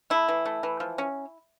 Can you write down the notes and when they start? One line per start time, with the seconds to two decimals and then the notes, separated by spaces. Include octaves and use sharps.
0.10 A3 E4
0.28 E3
0.46 A3
0.63 E3
0.80 F3
0.98 C#4